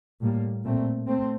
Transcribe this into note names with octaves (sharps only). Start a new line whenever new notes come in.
A2 G3 A#3
A#2 A3 C4
A3 C4